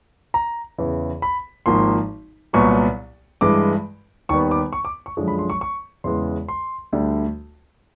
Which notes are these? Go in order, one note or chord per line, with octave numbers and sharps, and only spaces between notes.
A#5
E2 C#3 E3
B5
G#1 G#2 F3 A#3 C6
C2 A#2 F#3 B3 C#6
G2 E3 G#3 D6
D#2 D#3 G3 B3 C#6
D6
C#6
D6
C#6
F#2 D3 F3 G#3
B5
C6
C#6
C#6
E2 C#3 E3 G#3 C6
C6
D2 D3 G3